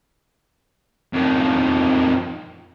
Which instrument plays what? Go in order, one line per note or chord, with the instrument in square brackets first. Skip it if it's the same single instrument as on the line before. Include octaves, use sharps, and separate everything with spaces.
[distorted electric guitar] F2 D#3